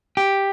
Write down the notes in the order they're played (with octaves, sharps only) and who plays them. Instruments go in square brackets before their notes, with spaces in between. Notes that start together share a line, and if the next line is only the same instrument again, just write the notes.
[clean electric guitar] G4